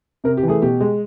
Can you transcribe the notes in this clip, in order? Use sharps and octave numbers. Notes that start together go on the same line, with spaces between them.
C3 A#4
G4
E3
A3 G#4
B2 G4
G#3